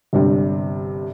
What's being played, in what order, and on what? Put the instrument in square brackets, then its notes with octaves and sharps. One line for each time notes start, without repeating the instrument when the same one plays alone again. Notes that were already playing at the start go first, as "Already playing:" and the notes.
[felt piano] G1 G2 C3